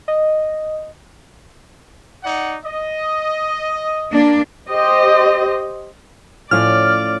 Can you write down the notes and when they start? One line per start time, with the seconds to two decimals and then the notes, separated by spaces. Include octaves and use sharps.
0.08 D#5
2.24 D#4 D5 F#5
2.65 D#5
4.12 A#3 D4
4.71 G4 C5 D#5
6.51 A2 F3 C#4 D5 F6